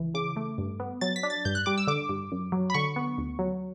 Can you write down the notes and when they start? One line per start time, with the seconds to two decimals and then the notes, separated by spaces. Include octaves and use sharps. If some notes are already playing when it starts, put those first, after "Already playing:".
Already playing: C#2 E3
0.14 C#3 D6
0.36 A3
0.58 G2
0.80 B3
1.01 F#3 A6
1.16 B6
1.23 D4
1.30 A6
1.45 G2 G6
1.55 F#6
1.66 G3 D6
1.78 E6
1.87 D3 D6
2.09 G2
2.32 F#2
2.52 F#3
2.70 B5
2.74 D3 C#6
2.96 B3
3.18 D2
3.39 F#3